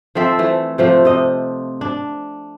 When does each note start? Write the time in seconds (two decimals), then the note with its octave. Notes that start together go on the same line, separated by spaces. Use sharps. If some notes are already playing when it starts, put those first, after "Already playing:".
0.15 F3 C4 A4 E5
0.39 E3 A3
0.78 C3 F3 A3
1.05 C3 D#5
1.81 D4